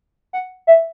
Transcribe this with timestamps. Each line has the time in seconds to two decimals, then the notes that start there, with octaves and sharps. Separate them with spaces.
0.33 F#5
0.67 E5